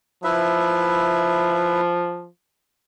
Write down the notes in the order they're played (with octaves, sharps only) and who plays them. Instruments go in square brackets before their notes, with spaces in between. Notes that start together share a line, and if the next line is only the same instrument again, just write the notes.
[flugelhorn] F3 [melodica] E4 B4 E5